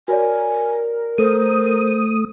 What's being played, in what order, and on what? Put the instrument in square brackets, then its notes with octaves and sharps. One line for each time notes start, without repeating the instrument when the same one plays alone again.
[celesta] F#4 C#5 D5 [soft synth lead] A#4 [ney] G#5
[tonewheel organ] A3 D#6 [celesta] A4 [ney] C5